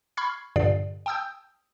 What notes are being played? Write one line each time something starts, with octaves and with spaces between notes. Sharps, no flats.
B5 C#6 F6 G#6 C7
G2 A#2 D3 D5 C7
G5 A5 D#6 E6 G6